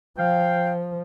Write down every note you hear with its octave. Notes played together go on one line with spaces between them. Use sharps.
F3 F5 G5